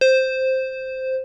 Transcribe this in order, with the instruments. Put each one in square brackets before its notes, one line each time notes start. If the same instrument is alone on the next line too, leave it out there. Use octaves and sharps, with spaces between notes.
[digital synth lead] C5